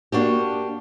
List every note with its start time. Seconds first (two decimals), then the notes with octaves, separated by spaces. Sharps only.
0.12 A#3 D4 F#4 G4